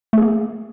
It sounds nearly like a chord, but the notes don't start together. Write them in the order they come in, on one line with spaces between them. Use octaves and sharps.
A3 G#4 A#3